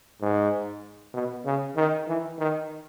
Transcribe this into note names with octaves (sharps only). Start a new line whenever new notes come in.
G#2
B2
C#3
D#3
E3
D#3